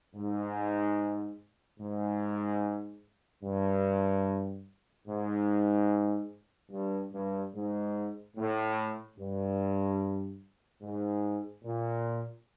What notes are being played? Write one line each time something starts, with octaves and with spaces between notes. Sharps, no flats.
G#2
G#2
G2
G#2
G2
G2
G#2
A2
G2
G#2
A#2